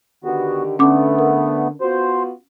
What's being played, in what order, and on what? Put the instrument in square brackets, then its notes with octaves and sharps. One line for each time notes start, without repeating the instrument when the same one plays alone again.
[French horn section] D3 D#3 G4 [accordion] B3 F#4
[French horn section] D3 [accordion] A3 B3 [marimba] C#4 D6
[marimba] A#4
[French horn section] B3 F4 F#4 [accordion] C5